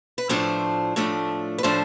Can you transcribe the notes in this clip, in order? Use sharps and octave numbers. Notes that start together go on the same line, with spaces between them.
B4
A2 F3 A3 D4 C5
A2 F3 A3 D4
B4
A2 F3 A3 D4 C5